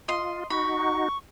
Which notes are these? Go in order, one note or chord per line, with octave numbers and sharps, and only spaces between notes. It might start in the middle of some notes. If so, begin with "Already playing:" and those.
F4 D#5 C6
D#4 F#4 B5 C#6